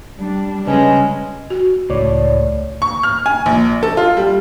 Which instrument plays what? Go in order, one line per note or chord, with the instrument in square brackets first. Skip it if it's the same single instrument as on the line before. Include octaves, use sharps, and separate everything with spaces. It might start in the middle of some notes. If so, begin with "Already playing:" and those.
[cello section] G3 D4
[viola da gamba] C#3 G#3 [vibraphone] B4 D#5 G#5
[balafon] F#4
[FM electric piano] C#2 [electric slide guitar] A2 [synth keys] C#5 D5
[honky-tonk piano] C#6
F6
G#5
A#1
A4
F4
G3